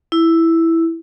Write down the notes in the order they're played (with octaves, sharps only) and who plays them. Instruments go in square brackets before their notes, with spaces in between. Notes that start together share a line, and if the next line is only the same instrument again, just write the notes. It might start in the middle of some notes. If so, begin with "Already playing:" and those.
[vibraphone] E4